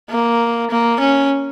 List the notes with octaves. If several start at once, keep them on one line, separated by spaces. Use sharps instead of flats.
A#3
A#3
C#4